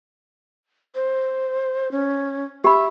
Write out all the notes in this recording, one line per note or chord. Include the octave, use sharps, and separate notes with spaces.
C5
C#4
G4 E5 B5